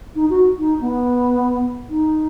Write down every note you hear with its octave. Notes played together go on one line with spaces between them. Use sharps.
D#4
F#4
D#4
B3
D#4